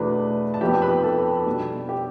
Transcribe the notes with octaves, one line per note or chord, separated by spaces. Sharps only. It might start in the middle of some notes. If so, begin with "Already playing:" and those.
Already playing: E2 B2 A3 D4 B4
A5
F2 C3 F3 B3 G4 G5
B4 B5
A4 A5
B2 G3 B3 D4
G4 G5